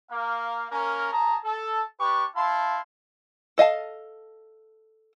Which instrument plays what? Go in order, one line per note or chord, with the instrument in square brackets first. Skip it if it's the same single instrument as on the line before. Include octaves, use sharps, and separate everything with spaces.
[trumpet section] A#3 F5
A#3 C#4 A#4
G#4 A5 A#5
A4
D4 G4 B4 C#6
E4 F5 A5 C6
[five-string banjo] A4 D#5 F5 A5